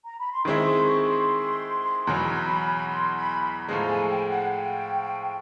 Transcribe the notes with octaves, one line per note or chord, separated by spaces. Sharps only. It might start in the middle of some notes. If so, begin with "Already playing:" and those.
A#5
B5
C6
D#3 G#3 C4 E4 C#6
C6
C#6
C6
E2 B2 F#3 B5
C6
B5
B5
A2 F3 G#3 A#5
G#5
G5
F#5
G5